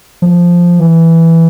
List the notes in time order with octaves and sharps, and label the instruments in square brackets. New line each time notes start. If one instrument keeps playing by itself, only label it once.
[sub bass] F3
E3